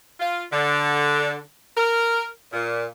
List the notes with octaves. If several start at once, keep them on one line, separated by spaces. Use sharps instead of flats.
F4
D3
A#4
A#2